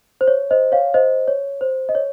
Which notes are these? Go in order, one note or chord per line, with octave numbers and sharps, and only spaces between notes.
C5
C#5
C5 D#5
C#5 F5
C5 D#5
C#5
C5
D#5
C#5